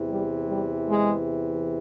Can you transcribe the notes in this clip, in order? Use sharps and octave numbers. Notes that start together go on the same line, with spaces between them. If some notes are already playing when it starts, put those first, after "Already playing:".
Already playing: E2 C3 E3
G3
G3
G#3